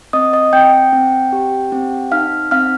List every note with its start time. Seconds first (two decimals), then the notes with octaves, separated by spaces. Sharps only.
0.13 C4 D#5 D#6
0.33 D#5 D#6
0.53 C4 G5 G6
0.93 C4
1.33 G4
1.72 C4
2.12 D#4 F5 F6
2.51 C4 F5 F6